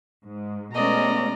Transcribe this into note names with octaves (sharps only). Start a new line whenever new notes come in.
G#2
B2 G#3 A3 B3 C#4 D5 D#5 A#5